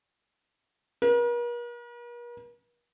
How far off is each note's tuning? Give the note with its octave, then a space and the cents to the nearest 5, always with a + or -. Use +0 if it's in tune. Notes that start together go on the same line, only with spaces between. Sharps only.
A#4 +45